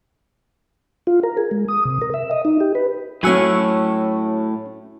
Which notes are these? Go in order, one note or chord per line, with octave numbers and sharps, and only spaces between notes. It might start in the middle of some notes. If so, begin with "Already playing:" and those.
F4
A#4
G#4
G#3
D#6
C3
A#4
E5
D#5
D#4
G4
B4
A2 F#3 C#4 F#4 G#5 E6